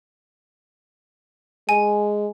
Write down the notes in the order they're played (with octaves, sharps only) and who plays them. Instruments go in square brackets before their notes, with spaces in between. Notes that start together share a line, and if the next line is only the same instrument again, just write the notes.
[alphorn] G#3 [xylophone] G#5